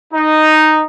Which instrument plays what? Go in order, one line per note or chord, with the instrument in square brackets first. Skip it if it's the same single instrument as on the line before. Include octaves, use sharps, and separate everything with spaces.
[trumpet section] D#4